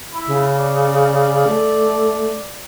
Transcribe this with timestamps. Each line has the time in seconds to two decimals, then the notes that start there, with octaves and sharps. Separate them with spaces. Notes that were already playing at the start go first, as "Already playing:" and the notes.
0.15 E4
0.27 C#3
0.59 D5
1.47 A3